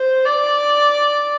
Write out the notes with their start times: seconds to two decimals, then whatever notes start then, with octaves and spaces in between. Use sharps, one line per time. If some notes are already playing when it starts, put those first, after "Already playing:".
Already playing: C5
0.25 D5